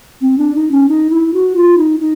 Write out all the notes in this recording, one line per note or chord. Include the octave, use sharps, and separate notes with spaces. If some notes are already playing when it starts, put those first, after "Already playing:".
C4
D4
D#4
C#4
D#4
E4
F#4
F4
D#4
D#4